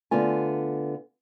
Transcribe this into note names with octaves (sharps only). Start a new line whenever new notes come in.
D3 A3 B3 F4 G#5